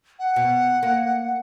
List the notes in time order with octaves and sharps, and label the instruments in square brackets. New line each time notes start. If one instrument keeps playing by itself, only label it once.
[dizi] F#5
[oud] B2
A#3